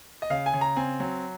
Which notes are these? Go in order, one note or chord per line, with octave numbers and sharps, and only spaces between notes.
D#5
C#3 F5
G#5
C#3
A#5
C4 G#5
F#3